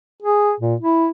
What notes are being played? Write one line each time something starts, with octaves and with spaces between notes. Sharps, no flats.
G#4
A#2
E4